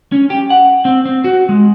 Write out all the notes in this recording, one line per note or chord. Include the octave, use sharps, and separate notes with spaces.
C#4
G4
F#5
C4
C4
F#4
G#3